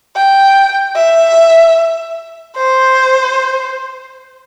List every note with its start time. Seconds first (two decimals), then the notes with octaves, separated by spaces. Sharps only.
0.16 G5
0.96 E5
2.57 C5